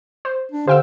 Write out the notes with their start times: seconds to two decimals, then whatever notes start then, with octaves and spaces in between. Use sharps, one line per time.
0.25 C5
0.52 D4
0.68 D3 G4 C5 F5 G5 E6